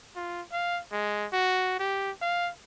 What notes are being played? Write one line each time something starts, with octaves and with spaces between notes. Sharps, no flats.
F4
F5
G#3
F#4
G4
F5